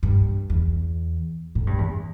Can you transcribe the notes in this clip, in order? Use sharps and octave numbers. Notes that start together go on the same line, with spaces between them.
G2
E2
A2
G2
E2